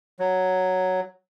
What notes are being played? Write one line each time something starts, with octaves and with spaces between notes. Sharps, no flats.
F#3